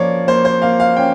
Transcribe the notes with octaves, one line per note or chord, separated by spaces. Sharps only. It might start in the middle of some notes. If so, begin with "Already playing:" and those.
Already playing: F3 A#3 C#4 C#5 D5
A#3 C5
C5
A#3 F5
F5
C#4 G5